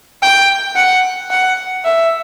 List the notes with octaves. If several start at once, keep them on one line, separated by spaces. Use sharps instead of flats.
G5
F#5
F#5
E5